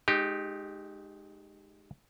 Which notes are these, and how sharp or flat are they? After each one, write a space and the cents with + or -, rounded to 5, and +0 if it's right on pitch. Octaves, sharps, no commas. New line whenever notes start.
G#3 +25 D#4 -15 G4 +0